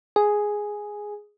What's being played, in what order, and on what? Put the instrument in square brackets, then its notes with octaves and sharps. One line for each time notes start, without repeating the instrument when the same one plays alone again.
[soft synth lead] G#4